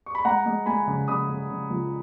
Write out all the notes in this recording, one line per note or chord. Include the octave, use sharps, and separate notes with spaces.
C#6
B5
G#3 F#5 A#5
G#3
G#3 G#5 B5
C#3
C#3 B5 D#6
C#3
C#3
C#2